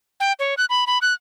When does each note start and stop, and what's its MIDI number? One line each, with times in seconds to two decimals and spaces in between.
0.20 0.33 79
0.39 0.54 73
0.58 0.65 90
0.70 0.84 83
0.87 0.98 83
1.02 1.14 90